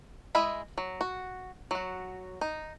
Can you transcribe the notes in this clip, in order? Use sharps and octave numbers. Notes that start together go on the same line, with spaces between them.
G#3 E4 D#5 E5 B5
F#3
F#4
F#3 F#4
D#4